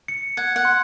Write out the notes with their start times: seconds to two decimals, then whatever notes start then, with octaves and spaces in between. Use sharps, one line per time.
0.08 C#7
0.37 F#5 G#6
0.56 F#5
0.65 C6